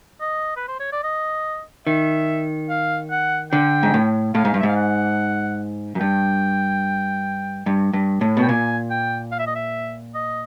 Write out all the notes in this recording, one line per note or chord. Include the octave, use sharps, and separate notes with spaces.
D#5
B4
C5
C#5
D5
D#5
D#3 E5
F5
F#5
D3 G5
G#2
A2
A2 F5
G#2
G2
E5
G#2 F5
F#5
F#2
G2 G5
G2
G2
A2
B2
G5
A#2 G#5
G5
F5
E5
D#5
E5
D#5